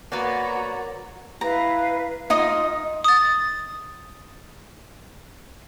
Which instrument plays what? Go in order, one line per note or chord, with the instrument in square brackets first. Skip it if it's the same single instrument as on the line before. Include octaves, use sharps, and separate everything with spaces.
[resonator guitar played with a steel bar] A#3 B3 B4 [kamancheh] F#4 A#5 [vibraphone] A#4 [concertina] C#5 D5
[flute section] E4 B4 F5 [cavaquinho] A#5
[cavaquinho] D#4 D#5 D#6 [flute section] F4
[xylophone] D#6 A6